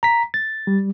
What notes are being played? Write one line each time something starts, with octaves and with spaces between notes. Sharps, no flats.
A#5 B6
A6
G3